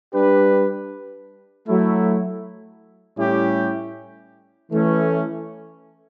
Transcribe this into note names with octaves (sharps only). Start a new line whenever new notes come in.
G3 D4 G4 B4
F#3 A3 E4
A2 G3 C#4 E4 G4
E3 A3 C#4